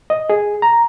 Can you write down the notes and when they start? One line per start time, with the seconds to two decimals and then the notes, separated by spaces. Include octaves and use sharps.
0.10 D#5
0.30 G#4
0.62 A#5